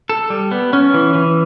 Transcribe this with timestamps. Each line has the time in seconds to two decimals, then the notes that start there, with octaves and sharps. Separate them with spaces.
0.09 A4
0.30 G3
0.51 B3
0.73 C#4
0.94 E3
1.15 E3